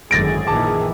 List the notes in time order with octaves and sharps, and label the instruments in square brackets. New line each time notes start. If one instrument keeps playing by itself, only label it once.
[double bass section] G#1 F#2 D3 [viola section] G#4 [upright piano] A6 A#6 D7
[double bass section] A#1 D#3 E3 [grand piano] A5 D6